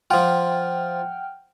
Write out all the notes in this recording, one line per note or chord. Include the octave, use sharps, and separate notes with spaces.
F3 F4 F#5 G5 F6